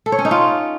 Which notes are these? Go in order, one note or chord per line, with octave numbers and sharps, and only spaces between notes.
A4
C#5
C#4
D#4
F4